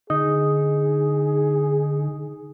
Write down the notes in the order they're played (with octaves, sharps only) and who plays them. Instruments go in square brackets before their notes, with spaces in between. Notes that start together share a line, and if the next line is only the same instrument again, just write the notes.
[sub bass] D3 [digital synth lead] D#4 [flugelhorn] G#4